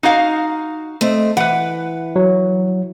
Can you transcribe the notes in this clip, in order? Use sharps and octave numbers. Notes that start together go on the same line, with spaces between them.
D#4 F#4 F5
A3 C4 D#5
E3 B4 F#5
F#3